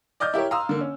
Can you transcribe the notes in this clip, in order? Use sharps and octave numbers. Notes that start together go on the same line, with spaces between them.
D5 D#5 F6 G6
E4 G4 A#4 C#5
F5 A#5 C6 D#6 E6
D3 A#3
C#4